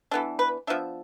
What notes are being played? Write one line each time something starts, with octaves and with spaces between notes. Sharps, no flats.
E3 B3 D4 A4
B4
F3 B3 D4 E5